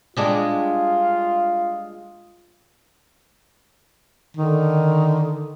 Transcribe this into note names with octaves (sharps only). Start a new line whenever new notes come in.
G3 G#3 D4 F4
D3 D#3